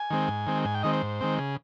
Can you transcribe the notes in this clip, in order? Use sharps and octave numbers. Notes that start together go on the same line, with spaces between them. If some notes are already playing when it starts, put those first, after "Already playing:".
Already playing: G#5
D#3 G#3 C4
G#2
D#3 G#3 C4
G#2 G#5
G5
D#3 G#3 C4 D#5
C5
G#2
D#3 G#3 C4
C#3 G#4